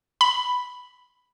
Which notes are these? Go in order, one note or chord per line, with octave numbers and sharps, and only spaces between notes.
B5